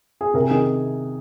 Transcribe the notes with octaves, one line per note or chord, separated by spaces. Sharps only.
G#4
C3 A#4
D#3 G#4